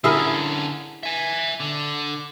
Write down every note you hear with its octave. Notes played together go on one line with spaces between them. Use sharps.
D3 C#4 E4 G#4 A#4
E5 G#5
D3